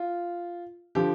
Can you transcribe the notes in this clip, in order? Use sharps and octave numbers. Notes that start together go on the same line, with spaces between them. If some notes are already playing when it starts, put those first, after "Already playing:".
Already playing: F4
D3 F3 G4